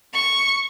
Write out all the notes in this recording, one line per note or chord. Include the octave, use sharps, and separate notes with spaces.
C#6